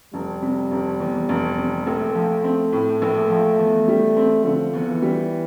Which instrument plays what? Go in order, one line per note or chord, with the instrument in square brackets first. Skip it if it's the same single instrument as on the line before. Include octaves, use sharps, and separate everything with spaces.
[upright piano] F1 [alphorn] G3
[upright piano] C3
F1
E2
F1
C3
[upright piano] A#1 [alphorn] A3
[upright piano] F3
C4
A2
A#1
F3
E2
G3
C4
[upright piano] D3 [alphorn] F3
[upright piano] E2
[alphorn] E3
[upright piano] G3